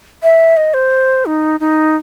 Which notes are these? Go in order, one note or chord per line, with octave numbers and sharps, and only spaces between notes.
E5
D#5
C5
D#4
D#4